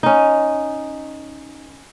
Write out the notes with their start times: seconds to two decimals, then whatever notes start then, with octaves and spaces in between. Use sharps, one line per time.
0.03 C#4 D#4